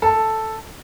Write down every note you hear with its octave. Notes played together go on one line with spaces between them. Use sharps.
A4